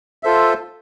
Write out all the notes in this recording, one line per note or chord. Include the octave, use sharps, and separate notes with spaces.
F4 A4 C5 E5